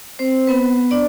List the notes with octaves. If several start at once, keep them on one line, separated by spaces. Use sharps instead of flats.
C4 C5
B3 B4
D4 D5